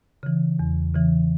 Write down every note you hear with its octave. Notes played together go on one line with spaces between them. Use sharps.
C#3 E3
E2
C#3 E3